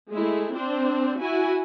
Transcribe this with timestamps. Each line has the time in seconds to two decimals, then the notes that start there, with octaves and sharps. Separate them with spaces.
0.10 G#3 A3 E4
0.54 C4 D4 C5
1.18 E4 F#4 G#5